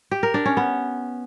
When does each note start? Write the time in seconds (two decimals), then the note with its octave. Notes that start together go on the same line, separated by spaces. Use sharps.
0.11 G4
0.23 A#4
0.34 D4
0.46 C#4
0.57 B3